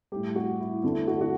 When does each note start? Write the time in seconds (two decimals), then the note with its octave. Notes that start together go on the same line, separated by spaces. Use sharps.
0.12 A2 G3 G4
0.36 F#4
0.60 E4
0.83 E2 D3 A3 E4
1.07 F#4
1.21 F#4